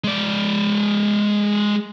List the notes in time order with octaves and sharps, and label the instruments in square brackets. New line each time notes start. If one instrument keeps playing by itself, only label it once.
[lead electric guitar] G#3 D5